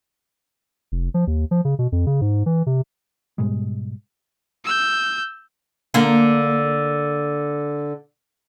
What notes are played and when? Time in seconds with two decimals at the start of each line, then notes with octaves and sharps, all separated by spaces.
0.92 F1
1.14 F3
1.27 D#2
1.51 F3
1.65 C#3
1.79 B2
1.92 F2
2.07 C#3
2.21 G#2
2.46 E3
2.66 C3
3.38 G#2 B2 G3 G#3
4.65 E6 G6
5.94 D3 A#3